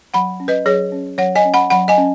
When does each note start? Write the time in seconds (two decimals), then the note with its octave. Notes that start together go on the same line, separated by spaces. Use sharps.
0.14 F#3 F#5 B5
0.40 C#4
0.48 B4 D#5
0.66 F#3 G#4 C#5
0.92 C#4
1.18 F#3 C#5 F#5
1.36 D#5 G#5
1.45 C#4
1.54 F#5 B5
1.70 F#3 F#5 B5
1.88 D#5 G#5
1.98 C#4